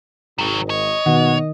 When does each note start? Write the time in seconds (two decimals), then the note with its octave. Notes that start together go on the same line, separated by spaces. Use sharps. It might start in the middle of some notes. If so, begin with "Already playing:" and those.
0.38 G#1 C3 F#3
0.70 C#5 D#5
1.06 B2 D#3 F#5